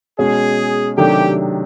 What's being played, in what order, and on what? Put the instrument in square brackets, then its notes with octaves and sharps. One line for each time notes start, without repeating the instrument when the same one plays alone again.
[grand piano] B2 G#3 C#4 [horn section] G#4
[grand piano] C3 D#3 F#3 A3 D4 [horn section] G4